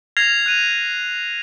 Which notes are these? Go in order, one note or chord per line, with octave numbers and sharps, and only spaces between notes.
F6 G#6 A#6 C7 F7
F#6 D#7 F7